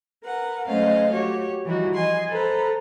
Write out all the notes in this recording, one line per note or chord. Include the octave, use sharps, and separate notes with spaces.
A#4 B4 F#5
F#3 A3 C#4 C5 D#5 F5
F#4 G4 C#5
E3 F3 G3 D#4 F#4
D#5 G#5 C6
A4 B4 C5 A#5